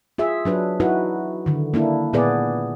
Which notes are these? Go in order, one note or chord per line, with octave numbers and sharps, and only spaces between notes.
F4 G#4 E5
F#3 D4 B4
D#4 E4 F#4 B4
D3 D#3
A#3 D4 E4
A#2 B3 G#4 B4 D5